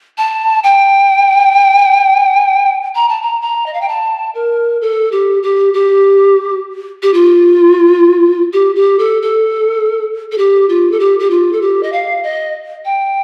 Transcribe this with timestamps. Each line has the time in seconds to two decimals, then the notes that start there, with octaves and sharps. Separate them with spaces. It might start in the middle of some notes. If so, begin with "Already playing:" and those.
0.18 A5
0.64 G5
2.95 A#5
3.09 A5
3.22 A#5
3.42 A#5
3.66 D#5
3.74 F5
3.81 G5
3.88 A5
4.35 A#4
4.81 A4
5.12 G4
5.43 G4
5.74 G4
7.03 G4
7.14 F4
8.53 G4
8.76 G4
8.99 A4
9.22 A4
10.32 A4
10.38 G4
10.69 F4
10.92 A4
11.00 G4
11.19 G4
11.30 F4
11.53 A4
11.62 G4
11.83 D#5
11.93 F5
12.23 D#5
12.85 G5